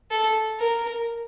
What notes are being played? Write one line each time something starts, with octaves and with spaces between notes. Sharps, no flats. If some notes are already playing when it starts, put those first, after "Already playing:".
A4
A#4